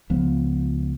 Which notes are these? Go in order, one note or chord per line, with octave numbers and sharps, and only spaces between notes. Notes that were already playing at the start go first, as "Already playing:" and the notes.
C#2 F3 B3